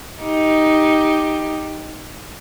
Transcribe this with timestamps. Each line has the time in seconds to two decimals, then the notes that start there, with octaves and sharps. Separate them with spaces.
0.22 D#4 G4